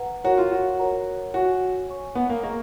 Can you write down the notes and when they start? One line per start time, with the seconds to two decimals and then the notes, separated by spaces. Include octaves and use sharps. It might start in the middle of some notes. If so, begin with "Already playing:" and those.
Already playing: B4 F#5 A#5
0.24 F#4 A#4 C#5 F#5 A#5
0.38 F4
0.52 F#4
0.80 A#4 C#5 F#5 A#5
1.34 F#4 C#5 G#5 C#6
1.89 C#5 G#5 C#6
2.15 B3
2.30 A#3
2.43 A#3 G#4 D#5 A#5 C#6